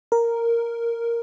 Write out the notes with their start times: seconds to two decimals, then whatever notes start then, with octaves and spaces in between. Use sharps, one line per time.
0.12 A#4